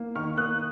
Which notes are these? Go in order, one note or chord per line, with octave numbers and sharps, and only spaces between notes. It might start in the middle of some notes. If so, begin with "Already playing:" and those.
Already playing: A#3
D#3 C#6 F6
A#3 D#6 F#6